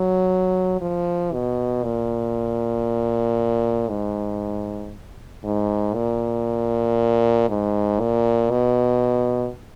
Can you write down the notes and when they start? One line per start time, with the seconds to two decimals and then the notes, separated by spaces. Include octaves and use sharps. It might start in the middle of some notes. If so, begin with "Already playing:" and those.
Already playing: F#3
0.81 F3
1.33 B2
1.84 A#2
3.89 G#2
5.43 G#2
5.94 A#2
7.49 G#2
8.00 A#2
8.51 B2